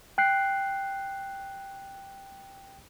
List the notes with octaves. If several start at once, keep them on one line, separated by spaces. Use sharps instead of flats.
G5 F#6 C7